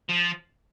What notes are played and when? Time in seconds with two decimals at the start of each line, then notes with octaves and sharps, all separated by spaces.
0.09 F3